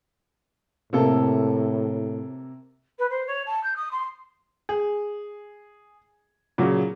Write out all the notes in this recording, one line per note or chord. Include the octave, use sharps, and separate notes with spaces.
A2 C3 A#3 A4
B4
C5
C#5
A5
G6
D#6
C6
G#4
A#2 C#3 F#3